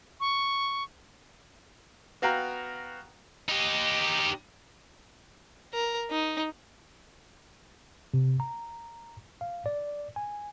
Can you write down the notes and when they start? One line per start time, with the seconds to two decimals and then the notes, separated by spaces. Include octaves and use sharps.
0.20 C#6
2.22 B3 F#4 F5 G5 A#5
3.48 D#4 G4
5.74 A#4
6.11 D#4
8.14 C3
8.40 A#5
9.41 F5
9.66 D5
10.16 G#5